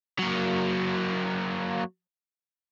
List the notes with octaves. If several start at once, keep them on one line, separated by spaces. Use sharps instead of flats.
F#3 A#3